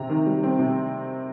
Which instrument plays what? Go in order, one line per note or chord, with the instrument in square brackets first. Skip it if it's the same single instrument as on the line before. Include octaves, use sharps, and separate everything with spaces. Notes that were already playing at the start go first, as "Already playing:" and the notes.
Already playing: [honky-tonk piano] C3 C4 A#5
D#3
G3
C4
C3